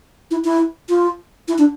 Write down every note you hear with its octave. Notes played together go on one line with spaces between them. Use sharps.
E4
E4
F4
E4
D4